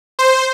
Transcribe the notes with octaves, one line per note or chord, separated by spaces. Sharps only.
C5